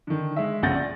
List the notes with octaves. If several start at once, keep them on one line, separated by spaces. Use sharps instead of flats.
D3 D#3
G#3 E5
A#1 C#3 F#5 G6 A6 A#6
D5